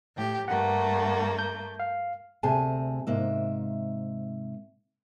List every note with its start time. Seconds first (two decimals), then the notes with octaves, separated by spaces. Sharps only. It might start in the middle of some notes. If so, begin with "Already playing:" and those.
0.16 A2 G4
0.48 G2 A3 A#3 F#5
1.39 G6
1.80 F5
2.43 D2 C3 A3 G#4 G#5 A5
3.07 G#2 C3 A#3 E5